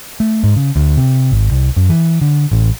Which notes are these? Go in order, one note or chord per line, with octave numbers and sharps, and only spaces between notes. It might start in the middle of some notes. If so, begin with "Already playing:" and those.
A3
G#2
C#3
D2
C3
G#1
C2
F#2
E3
D3
A1